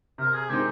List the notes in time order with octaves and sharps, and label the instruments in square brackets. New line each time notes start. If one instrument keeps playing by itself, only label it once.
[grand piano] C3 [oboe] A#4
[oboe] G#4
[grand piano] D#3 G#3 C4 D#4 [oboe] G4